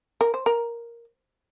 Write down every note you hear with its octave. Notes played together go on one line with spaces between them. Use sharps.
A#4
C5
A#4